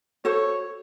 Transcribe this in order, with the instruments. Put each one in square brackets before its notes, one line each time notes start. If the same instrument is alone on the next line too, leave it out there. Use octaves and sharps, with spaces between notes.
[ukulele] F#4 A4 C5 [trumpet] C#5